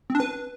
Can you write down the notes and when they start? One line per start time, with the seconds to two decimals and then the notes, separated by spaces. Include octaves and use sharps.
0.10 C4
0.15 D4
0.20 B4